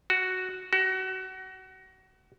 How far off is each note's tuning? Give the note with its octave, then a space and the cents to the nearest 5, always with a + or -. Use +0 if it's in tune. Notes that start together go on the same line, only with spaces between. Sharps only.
F#4 +5
F#4 +30